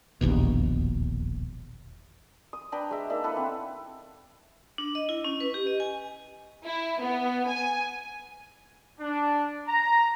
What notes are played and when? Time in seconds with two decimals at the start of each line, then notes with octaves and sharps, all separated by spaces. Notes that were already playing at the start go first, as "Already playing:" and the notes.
0.21 E1 A#1 D#2 B2
2.53 D#6
2.72 D4 B4 G5 A#5
2.91 G#3 E5
3.10 A#3 D4 D#4 E5
3.24 E4 A4 B4
3.37 C4 F#5
4.78 D4
4.95 D#5
5.09 E4
5.24 C#4
5.40 B4
5.54 G4
5.67 D#5
5.80 G#5
6.65 E4
7.01 B3
7.48 G#5
8.99 D4
9.67 A#5